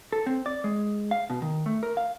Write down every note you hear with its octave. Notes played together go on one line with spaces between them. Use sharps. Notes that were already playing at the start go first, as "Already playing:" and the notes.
A4
C4
D5
G#3
F5
B2
D#3
A3
A#4
F5